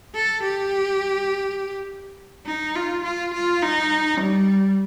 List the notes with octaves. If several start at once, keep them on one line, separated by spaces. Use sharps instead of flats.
A4
G4
D#4
F4
F4
F4
D#4
G3